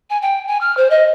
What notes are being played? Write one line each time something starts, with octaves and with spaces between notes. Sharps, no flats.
G#5
G5
G#5
F6
C5
D#5